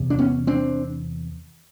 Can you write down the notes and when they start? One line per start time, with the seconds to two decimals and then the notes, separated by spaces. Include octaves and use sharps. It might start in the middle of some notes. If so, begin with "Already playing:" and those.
Already playing: E2 C3
0.10 D4
0.19 B3 C#4
0.47 C4 D4